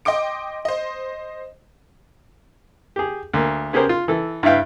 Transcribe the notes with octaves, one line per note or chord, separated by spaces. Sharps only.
D#5 G5 C6 D6 D7
C5 D#5
G4 G#4
D2 A#3
B3 C#4 G4 G#4 A#4 C5
F4
E3 A4
G2 E4 B4 E5 F5 G5